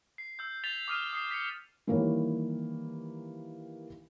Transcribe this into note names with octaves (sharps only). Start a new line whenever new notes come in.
C7
E6 G6
A6 B6 F7 G7
D6 D#6 F6 C7 D#7
D#6 C7
B6 C#7
D#3 E3 G3 A#3 G4 C#5